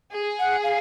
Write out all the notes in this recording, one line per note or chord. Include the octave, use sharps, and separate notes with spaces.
G#4
F#5
F5